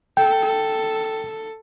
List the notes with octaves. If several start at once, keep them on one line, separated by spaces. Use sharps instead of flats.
A4 G5